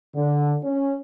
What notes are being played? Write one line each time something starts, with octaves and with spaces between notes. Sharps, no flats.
D3
C#4